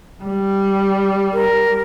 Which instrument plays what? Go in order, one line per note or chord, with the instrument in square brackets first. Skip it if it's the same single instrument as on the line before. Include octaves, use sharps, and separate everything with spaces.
[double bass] G3
[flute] A#4